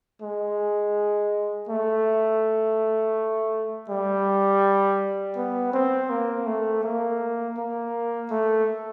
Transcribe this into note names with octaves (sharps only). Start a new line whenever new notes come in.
G#3
A3
G3
B3
C4
A#3
A3
A#3
A#3
A3